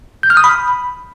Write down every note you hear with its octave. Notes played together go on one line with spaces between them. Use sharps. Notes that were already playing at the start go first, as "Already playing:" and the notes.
G6
F6
D#6
B5